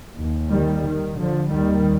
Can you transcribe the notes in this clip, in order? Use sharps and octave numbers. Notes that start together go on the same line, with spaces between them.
D#2
D#3 G3
D#3
D3 F3
D#2 D#3 G3